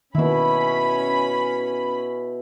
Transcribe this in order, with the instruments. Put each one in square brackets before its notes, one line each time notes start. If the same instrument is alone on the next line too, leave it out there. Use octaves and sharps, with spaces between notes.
[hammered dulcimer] B2 E4 [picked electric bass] D#3 A#3 [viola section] C#4 B5